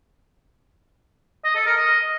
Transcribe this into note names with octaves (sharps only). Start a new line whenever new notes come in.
D#5
A4
A#4
D#5